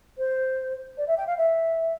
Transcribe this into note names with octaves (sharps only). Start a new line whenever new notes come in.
C5
D5
E5
G5
F5
E5